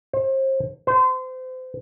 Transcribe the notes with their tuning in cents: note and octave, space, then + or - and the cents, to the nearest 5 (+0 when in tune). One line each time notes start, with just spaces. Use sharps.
C5 +35
C5 -30